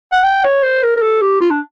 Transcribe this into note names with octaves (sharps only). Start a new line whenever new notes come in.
F#5
G5
C#5
C5
A#4
A#4
A4
G4
F4
D4